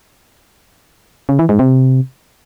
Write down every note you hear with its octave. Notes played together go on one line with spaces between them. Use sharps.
C#3
E3
G#2
C3